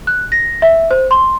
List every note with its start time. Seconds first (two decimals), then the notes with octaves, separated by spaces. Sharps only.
0.07 F#6
0.32 A#6
0.62 E5
0.91 C5
1.11 C6